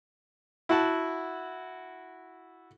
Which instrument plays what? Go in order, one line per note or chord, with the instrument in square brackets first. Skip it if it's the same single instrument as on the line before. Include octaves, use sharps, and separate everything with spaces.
[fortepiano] E4 F#4 F#5 A5